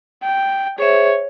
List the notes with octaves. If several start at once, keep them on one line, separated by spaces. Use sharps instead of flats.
G5
G#4 C5 C#5 E5